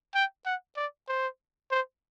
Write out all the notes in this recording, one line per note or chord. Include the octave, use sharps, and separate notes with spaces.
G5
F#5
D5
C5
C5